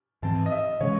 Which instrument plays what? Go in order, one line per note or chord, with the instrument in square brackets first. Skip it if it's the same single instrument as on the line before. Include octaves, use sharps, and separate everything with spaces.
[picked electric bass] G#2 E3 C4 [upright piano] A5
[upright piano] D#5
E5
D#5
[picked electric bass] C#3 E3 G#3 C#4 [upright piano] C#5